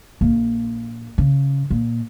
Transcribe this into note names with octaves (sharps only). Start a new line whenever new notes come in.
A#1 A#3
C#3
A#2